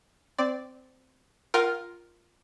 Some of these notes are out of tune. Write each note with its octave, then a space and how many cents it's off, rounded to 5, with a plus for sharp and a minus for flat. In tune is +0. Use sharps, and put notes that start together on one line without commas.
C4 -15 D5 +0
F4 +0 A#4 +5 F#5 +45